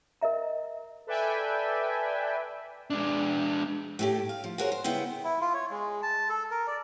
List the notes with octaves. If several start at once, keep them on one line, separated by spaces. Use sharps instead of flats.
A#4 D#5 E5 A#5
A4 B4 D5 E5 G5 G#5
G#3 D4
A2 A3 G4
F5
F3
F#4 G#4 A#4 C5 C#5
C5
C#3 B3 E4 G5
E4
F4
C#5
G#3
A5
A4
A#4
D5